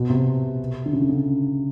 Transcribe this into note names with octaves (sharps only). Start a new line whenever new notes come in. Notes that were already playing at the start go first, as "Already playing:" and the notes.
Already playing: B2
C3
D3
C#3
D3
C#3